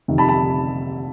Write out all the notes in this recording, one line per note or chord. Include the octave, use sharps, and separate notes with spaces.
F2 C3 D#3
A5 B5
A5 B5